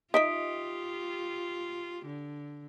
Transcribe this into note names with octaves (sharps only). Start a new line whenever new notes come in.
D#4 F4 G4 D#5 E5 D#6 B6 D7
D3